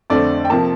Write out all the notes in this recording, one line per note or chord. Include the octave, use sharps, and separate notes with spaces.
F2 D3 A3 C4 D5
G5
C3 F3 A#3 A5